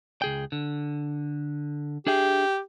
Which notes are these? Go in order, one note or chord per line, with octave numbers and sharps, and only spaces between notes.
C#2 G#4 G5
D3
D4 G4 G#4 E5